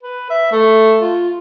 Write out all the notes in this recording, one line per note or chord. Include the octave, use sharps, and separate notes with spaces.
B4
E5
A3
F4